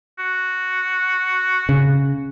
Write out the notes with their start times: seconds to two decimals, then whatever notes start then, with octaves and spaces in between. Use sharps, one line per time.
0.18 F#4
1.69 C#3